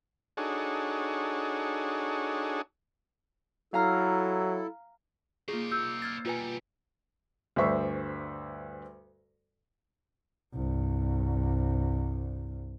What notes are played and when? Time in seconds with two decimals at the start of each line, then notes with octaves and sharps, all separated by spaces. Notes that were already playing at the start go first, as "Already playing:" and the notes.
0.37 D4 D#4 F#4 G#4 A4 C#5
3.74 F#3 E4 A4 F5 A#5 F6
5.48 A#3 D#4 F4 G#4 C5 D5
5.71 E6 G6
6.02 F6 G#6 A6
6.25 B2 G3 F4 B4 G#5
7.56 D2 G2 C5 E5 C#6
10.54 C2 G2